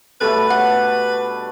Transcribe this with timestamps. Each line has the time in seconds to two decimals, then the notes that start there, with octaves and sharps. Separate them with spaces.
0.21 B2 G3 A3 A4 B4
0.50 D4 F#5